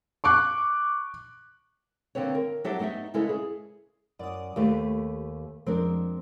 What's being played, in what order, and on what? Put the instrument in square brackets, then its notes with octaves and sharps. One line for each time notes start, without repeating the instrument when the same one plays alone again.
[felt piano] C#6 D6 F#6
[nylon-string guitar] D3 A#3 C4 B4 C#5
A#4
F#3 D4 G4 A4 E5 F#5
A3 B3 D#4 G4 E5
C#3 G#3 C#4 E4 A4 B4
G#4
[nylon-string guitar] F#2 [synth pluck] D5 D#6
[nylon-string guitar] D#2 A3 [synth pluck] G4 B4
[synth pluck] F2 F3 G#3 [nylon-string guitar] C4 D4 A#4